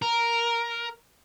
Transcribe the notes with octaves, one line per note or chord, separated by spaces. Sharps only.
A#4